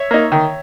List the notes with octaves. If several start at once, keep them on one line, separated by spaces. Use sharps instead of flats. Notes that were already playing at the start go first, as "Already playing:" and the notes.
Already playing: C#5 E5
A#3 D#4
D#3